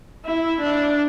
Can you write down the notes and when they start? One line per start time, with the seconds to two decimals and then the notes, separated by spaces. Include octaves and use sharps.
0.25 E4
0.61 D4